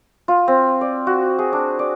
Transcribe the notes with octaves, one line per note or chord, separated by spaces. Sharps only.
F4
C4
D5
F#4
G#4
D4
D5